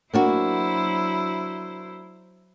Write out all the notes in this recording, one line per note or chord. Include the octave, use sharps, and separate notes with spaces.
F#3 A#3 D4 E4 F#4 C5